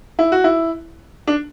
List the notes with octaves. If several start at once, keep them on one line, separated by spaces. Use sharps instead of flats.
E4
F#4
E4
D4